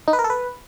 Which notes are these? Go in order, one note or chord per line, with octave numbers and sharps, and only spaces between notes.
D#4
B4
A#4
A4
B4